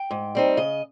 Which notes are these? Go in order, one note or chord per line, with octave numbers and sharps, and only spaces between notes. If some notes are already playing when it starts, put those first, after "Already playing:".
Already playing: G5
G#2
G3 C4 D#4
C#3 D#5